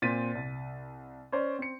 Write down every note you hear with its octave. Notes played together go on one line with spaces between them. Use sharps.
A#2 C4 A6 B6 D#7
C2
C#4 C5 D5
C4 C#7